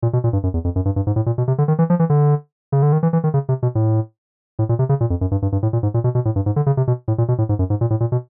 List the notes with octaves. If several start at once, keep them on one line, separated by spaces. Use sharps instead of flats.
A#2
B2
A#2
G2
F#2
E2
F2
F#2
G2
G2
G#2
A2
A#2
B2
C3
D3
D#3
E3
F3
E3
D3
C#3
D3
D#3
E3
E3
D#3
C#3
C3
B2
A2
A2
A#2
C3
C#3
A#2
F2
F#2
G2
G2
G2
A2
A#2
G#2
A#2
B2
B2
A2
G2
G#2
D3
C#3
C3
B2
A2
A#2
B2
A2
G#2
F#2
G#2
A#2
A2
A#2
B2